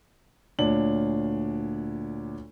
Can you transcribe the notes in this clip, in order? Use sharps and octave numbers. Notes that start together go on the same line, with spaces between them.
D2 A#2 D4 C#5 F#7